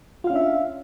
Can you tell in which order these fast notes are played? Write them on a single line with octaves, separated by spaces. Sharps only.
F4 F5 C#4 D4 E5